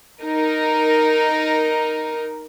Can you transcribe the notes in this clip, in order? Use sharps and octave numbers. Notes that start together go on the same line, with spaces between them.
D#4 A#4